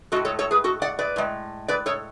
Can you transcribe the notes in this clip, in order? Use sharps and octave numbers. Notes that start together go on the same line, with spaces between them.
A2 G#3 F#4 A4
A4 C#5
A4 C#5
G#4 B4
F#4 A4
D5 F#5
B4 D5
A2 G#3
B4 D5
A4 C#5